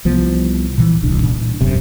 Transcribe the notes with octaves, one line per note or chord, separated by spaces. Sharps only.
C2 F3 B3
A#2 E3
D#1 C2 D4
A#2 D4
E1 F#2 C3